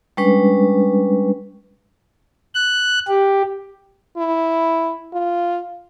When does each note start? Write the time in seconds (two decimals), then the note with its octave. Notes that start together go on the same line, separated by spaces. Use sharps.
0.17 G3 G#3 C#4 D4 B4
2.54 F#6
3.08 G4
4.17 E4
5.13 F4